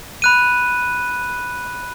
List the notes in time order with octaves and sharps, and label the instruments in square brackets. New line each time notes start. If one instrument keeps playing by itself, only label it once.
[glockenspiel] B5 F#6 D#7